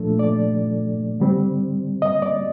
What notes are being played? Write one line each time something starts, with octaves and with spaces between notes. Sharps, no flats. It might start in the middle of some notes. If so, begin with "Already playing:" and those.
Already playing: A#2 F3 A3 D4 A4
D5
D3 G3 C4
D#5
D5